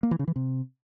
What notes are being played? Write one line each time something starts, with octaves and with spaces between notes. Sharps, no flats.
A#3
E3
C#3
E3
C3